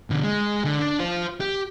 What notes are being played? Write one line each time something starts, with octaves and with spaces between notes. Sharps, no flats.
B2 D3
G#3
D3
D4
F4 C5
G4